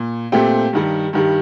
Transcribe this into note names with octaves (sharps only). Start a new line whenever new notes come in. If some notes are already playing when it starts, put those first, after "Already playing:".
Already playing: A#2
A#2 A3 C4 G4 G5
G2 D#3 G3
G2 D#3 G3